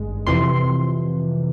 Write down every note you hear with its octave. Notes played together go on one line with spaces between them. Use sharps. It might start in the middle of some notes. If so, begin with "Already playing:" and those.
Already playing: G#1 G2 G#3
F2 C3 E3 C6